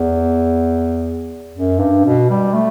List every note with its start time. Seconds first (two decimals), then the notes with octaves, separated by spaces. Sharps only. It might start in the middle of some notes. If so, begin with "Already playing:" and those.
Already playing: E2
1.55 F#2
1.80 G2
2.05 B2
2.30 G3
2.54 A3